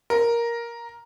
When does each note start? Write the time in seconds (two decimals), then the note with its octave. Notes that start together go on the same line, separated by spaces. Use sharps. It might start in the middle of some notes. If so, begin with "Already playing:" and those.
0.10 A#4